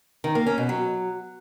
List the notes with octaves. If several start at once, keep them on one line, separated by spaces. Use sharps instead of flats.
D#3
A#3
C#4
B2
F#3